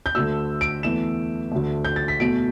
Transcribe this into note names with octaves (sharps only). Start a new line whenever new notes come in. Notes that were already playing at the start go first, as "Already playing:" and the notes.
G6
D2 D3 A3 E6
D7
E2 E3 A3 E7
D2 D3 A3
G6
A6
B6
E2 B2 A3 D7